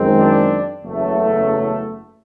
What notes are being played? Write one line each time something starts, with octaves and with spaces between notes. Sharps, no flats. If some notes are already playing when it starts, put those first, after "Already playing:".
Already playing: F#2 D#3 G#3 C4
D4
F#1 E2 C#3 F#3 A3